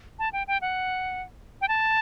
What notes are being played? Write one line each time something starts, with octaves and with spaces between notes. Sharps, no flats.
A5
G5
G5
F#5
G5
A5